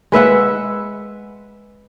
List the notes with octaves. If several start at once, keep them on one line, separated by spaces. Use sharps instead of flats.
G#3 B4 E5 F#5